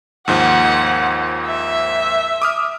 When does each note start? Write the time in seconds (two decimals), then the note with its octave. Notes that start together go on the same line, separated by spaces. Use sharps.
0.28 D#2 G#2 F3 F#5
1.47 E5
2.42 D6 D#6 F6